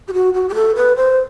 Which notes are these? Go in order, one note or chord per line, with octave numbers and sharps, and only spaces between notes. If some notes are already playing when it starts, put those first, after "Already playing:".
G4
F#4
F#4
G4
A4
B4
C5